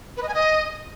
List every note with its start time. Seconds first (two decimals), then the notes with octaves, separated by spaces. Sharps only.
0.17 B4
0.23 D#5
0.28 G#5
0.34 D#5